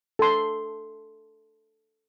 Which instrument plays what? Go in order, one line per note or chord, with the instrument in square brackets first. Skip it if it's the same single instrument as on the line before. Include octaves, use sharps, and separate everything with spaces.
[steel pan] A4 C6